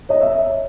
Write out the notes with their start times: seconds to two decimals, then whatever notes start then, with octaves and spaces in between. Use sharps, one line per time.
0.09 C#5 D#5
0.21 E5